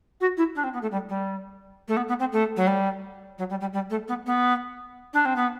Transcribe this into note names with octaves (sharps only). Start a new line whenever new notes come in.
F#4
E4
D4
C4
B3
A3
G3
G3
A3
B3
B3
C4
A3
F#3
G3
F#3
G3
G3
G3
A3
B3
B3
D4
C4
B3